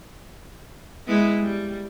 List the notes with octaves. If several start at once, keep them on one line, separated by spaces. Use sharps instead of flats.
G#3 B3 E4
G3